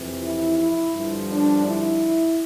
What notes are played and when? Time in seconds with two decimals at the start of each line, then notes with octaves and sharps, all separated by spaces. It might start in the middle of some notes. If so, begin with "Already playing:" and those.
Already playing: F2 C3 E3
0.23 E4
0.58 E4
0.93 G2 D3 F3
1.29 D4
1.64 E4